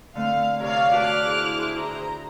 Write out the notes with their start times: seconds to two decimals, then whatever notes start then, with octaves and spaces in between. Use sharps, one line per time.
0.15 D3 A3 C4 F5
0.60 C3 A#4 C#5 D5 F5
0.92 F#4 B4 A5 D6 F6 F#6
1.23 E4 G#4 C5
1.76 A#5